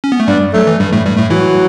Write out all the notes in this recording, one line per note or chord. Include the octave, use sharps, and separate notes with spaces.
C#4
B3
A3
G2 G3 D4
F#3 A3
E3
G2 G3
A2 A3
G2 G3
A2 A3
E3 F#3 E4